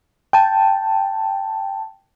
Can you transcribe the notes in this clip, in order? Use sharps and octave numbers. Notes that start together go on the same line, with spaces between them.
G5 A5